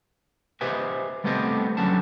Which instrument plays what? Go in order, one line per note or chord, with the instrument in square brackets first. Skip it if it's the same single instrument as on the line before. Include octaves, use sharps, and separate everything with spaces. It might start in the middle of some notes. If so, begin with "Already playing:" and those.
[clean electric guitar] G4 B4 C5 D#5 E5 G#5
G3 A3 B3 C4 G4 D#5
D3 F#3 G3 C#4 A5